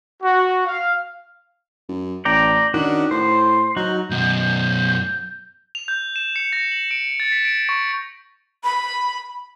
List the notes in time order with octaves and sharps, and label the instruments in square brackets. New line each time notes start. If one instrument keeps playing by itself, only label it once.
[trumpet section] F#4
F5
[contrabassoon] F#2
[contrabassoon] A1 [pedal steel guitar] D5 G5 A#5
[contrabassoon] D#3 [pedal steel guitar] C#4 D4 F#4
[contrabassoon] A2 [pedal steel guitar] C5
[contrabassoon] F#3 [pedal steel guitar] D#4 F#4
[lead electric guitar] F#2 B2 [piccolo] G6
[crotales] F7
G6
E7
C#7
A#6
F#7
D7
A6
B6
D7
C#6
[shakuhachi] B5